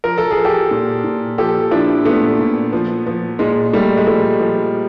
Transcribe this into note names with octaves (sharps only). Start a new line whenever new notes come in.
F3 A#4
A4
G#4
F3
G4 A4
A#2
A#2
F3 G4 A4
F3 D4 E4
A#2 A3 B3
A#2
F3
F3
A#2 G#3
A#2 G3 A3
G#3
F3 G3 A3
F3